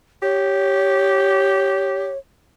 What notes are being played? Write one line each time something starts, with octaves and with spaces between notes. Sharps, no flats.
G4 C#5